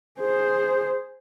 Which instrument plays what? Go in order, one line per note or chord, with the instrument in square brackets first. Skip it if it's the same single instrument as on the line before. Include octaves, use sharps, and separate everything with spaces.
[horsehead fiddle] G#4 C5